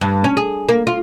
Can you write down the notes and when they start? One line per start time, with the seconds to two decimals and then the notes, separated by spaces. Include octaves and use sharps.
0.01 G2
0.24 C#4
0.37 G#4
0.69 A#3
0.87 F4